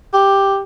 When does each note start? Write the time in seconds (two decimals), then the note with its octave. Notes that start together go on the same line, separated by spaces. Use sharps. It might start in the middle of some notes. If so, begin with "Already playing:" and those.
0.14 G4